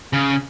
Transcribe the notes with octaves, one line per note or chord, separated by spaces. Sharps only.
C#3